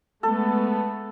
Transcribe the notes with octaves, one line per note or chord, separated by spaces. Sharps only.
G#3 A3 B3 A4